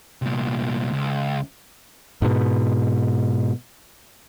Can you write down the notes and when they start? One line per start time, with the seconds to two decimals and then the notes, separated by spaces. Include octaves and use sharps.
0.22 C2 A#2
0.92 C#2
2.22 G#2 B2